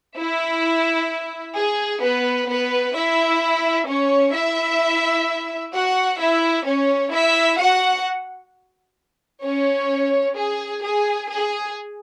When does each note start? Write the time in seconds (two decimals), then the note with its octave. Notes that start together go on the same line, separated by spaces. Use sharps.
0.18 E4 E5
1.57 G#4
2.03 B3 B4
2.49 B3 B4
2.95 E4 E5
3.88 C#4 C#5
4.35 E4 E5
5.74 F#4 F#5
6.20 E4 E5
6.66 C#4 C#5
7.13 E4 E5
7.59 F#4 F#5
9.44 C#4 C#5
10.37 G#4
10.83 G#4
11.30 G#4